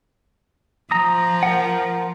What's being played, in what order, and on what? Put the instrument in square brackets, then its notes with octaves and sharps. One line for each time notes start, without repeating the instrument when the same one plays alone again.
[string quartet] F3 [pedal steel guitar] A#5 D#6
[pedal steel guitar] A#4 F#5